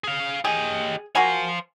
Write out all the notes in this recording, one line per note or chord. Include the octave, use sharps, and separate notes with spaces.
G#4 F5
G4 G#4 D#5
A#3 F#4 C5 F5 G#5